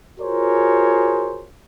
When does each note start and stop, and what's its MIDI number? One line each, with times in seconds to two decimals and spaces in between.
0.20 1.46 65
0.20 1.46 66
0.20 1.46 68
0.20 1.46 70
0.20 1.46 72
0.20 1.46 73